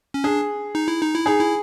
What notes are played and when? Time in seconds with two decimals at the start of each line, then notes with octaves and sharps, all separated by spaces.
0.14 C#4
0.24 D4 G#4
0.75 D#4
0.88 E4
1.02 D#4
1.15 E4
1.26 D#4 G#4
1.41 E4